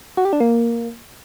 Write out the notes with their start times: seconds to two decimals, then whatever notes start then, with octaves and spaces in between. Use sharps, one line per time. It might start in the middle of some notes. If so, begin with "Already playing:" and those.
0.17 F#4
0.25 G4
0.33 D4
0.40 A#3